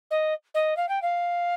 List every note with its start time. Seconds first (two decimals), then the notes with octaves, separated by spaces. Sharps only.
0.10 D#5
0.54 D#5
0.76 F5
0.89 G5
1.02 F5